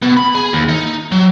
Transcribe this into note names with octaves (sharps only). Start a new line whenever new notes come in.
B2
B5
G#4
D#2
D#4
F#3